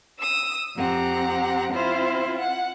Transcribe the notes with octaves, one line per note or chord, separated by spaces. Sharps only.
D#6 E6
F2 C4 G4 F#5 A#5
C4 E4 F4 C5
F#5